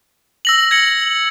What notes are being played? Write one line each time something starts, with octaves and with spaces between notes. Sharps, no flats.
E6 A#6 F#7
G#6 A#6 C#7 F#7